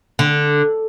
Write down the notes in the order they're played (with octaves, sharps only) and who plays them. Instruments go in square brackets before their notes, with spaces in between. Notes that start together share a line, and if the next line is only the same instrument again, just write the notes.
[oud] D3